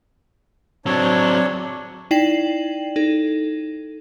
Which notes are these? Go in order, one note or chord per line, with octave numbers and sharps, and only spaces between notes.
F#3 C4 D4 C#5
D#4 E4 D5 G5 C7 F#7
D#4 A4